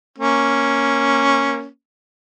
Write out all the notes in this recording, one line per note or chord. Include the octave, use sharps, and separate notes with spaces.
A#3 C#4